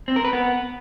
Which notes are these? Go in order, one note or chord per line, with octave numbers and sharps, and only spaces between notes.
C4
A#4
B4
B3